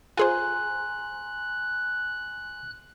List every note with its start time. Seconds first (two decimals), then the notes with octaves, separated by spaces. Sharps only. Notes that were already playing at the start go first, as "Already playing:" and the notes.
0.17 F4 G#4 C5 G#5 A#5 C6 F#6